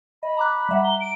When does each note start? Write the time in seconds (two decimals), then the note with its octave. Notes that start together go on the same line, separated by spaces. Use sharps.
0.23 D#5 B5
0.37 A#5 D6 F#6
0.69 G3 E5 F#5
0.84 A#5 G7
1.01 D7